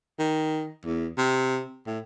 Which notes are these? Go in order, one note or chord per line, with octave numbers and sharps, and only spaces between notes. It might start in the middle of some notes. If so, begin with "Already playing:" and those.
D#3
E2
C3
A2